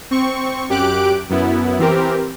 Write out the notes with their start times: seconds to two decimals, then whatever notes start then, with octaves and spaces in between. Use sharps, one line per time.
0.11 C4 C#6
0.69 F#2 G4 D6 F#6 D7
1.30 F#2 B3 E4
1.79 E3 C4 G4 A#4